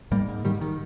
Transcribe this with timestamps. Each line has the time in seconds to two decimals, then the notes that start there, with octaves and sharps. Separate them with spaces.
0.11 G#2 G3 A#3
0.29 G#2
0.45 G#2 D#3 G3
0.61 D#3